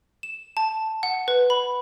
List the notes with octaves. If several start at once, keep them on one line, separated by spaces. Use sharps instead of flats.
E7
A5
F#5
B4
B5